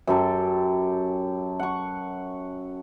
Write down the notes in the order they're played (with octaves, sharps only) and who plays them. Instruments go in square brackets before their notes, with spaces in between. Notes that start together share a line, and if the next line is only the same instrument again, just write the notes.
[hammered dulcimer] F#2 G4 A4
F#5 C#6